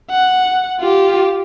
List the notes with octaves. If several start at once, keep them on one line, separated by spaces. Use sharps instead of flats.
F#5
F4 G4